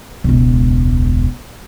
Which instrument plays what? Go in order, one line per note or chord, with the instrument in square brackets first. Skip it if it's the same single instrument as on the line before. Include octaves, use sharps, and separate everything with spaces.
[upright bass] E1 C#2